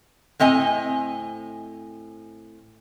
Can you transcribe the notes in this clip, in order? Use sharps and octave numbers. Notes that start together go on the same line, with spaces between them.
A2 C4 D#5 G#5